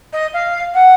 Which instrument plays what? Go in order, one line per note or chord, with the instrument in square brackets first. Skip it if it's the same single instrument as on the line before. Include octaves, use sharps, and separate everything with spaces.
[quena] D#5
F5
F#5